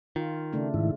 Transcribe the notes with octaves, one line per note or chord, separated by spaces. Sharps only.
D#3 F4
C#3 A3 D4
G#2 D#3 E4